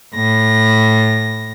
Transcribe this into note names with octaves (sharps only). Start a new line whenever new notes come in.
A2 A#6